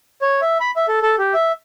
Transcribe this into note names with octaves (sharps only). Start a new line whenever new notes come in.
C#5
E5
B5
E5
A4
A4
G4
E5